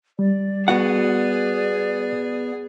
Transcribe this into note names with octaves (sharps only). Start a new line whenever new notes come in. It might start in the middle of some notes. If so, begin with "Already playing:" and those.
G3 D5
B3 F#4 G#4 F#5